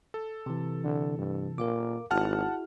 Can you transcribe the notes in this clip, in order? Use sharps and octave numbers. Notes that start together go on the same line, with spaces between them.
A4
C3 E3
D3
G2
A#2 A#4 F5 D6
G#1 E4 F#4 G#4 F#5 A5 F6